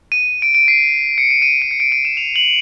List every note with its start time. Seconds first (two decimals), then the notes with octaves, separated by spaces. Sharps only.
0.12 D#7
0.42 D7
0.55 D7
0.68 C7
1.18 C#7
1.30 D#7
1.42 D#7
1.62 D7
1.71 C#7
1.80 D7
1.92 D#7
2.05 E7
2.17 F7
2.36 F#7